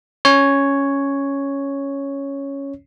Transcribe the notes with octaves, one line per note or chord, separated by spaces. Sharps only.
C#4 C#5